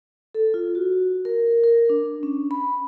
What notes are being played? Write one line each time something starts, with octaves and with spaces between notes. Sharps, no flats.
A4
F4
F#4
A#4
A#4
D4
C#4
B5